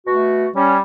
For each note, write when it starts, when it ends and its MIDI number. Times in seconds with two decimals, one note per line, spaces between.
0.07 0.47 47
0.07 0.47 57
0.07 0.47 66
0.56 0.81 55
0.56 0.76 61